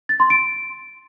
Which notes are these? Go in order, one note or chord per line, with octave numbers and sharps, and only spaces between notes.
A6
C6
D7